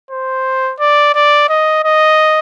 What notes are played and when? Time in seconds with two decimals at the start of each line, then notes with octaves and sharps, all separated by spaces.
0.11 C5
0.79 D5
1.14 D5
1.49 D#5
1.84 D#5